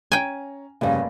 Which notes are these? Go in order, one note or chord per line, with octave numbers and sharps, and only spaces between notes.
C#4 G5 G#5 A#5
F1 G2 C#3 A#3 D5 F5